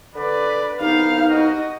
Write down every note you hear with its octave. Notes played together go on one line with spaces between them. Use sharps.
D3 B4 D5
C2 B3 D#4 F5 F6
F#4 D#5